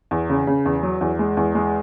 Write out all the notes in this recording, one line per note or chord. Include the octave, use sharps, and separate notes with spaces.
E2
C#3
C#3
E2
F#3
E2
G#3
E2
G#3